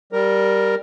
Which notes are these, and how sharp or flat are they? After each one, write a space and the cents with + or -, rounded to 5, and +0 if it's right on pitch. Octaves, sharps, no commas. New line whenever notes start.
G3 +0 A#4 +0